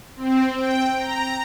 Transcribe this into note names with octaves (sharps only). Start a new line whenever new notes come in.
C4
G5
A#5